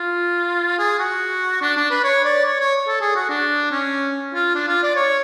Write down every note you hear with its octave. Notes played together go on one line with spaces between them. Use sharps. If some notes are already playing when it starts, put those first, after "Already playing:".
Already playing: F4
G#4
F#4
D4
D4
B4
C#5
D5
C#5
C#5
A4
G#4
F#4
D4
C#4
F4
D4
F4
D5
C#5